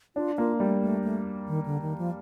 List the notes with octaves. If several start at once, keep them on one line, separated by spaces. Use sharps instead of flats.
D4 F4
A#3 F4
G3 A3
A3
A3
D#3
D3
D#3
F3